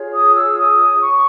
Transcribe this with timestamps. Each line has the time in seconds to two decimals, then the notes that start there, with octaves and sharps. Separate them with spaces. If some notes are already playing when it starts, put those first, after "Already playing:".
Already playing: F4 G#4 C#5
0.13 D#6
0.36 E6
0.58 D#6
1.02 C#6